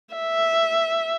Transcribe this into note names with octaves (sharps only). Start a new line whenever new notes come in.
E5